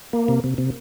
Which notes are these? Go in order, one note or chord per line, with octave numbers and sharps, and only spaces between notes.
A#3
C3
C3
C3